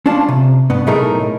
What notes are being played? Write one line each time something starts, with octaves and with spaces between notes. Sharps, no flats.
C#4 D4 F4 A5
C3
G2 B3
B1 A2 A3 D#4 G#4 A#4